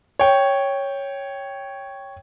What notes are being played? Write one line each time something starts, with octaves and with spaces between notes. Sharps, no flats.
C#5 G5